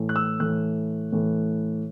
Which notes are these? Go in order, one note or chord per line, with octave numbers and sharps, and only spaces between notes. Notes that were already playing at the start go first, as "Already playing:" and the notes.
Already playing: A2 E3 A3
F#6
E6
A2 E3 A3 F#6
A2 E3 A3